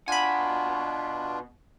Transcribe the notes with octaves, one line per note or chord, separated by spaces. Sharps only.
B2 D4 F4 F#5 G#5 B5